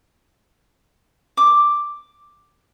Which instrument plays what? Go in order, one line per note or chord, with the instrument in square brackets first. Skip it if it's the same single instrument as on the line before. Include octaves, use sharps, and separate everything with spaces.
[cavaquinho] D6